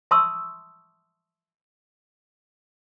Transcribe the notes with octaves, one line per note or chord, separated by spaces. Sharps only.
E5 A5 C6 C#6 D#6 E6